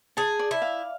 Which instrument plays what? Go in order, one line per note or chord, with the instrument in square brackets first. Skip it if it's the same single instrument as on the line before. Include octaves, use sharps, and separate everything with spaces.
[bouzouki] G#4 [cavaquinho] A5
[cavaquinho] D5
[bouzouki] E4
[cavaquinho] F5